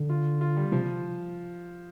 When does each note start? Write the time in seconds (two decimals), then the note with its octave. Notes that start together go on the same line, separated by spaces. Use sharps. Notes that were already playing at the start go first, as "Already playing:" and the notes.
Already playing: D3
0.10 F4
0.41 F4
0.57 G3
0.72 C3 F3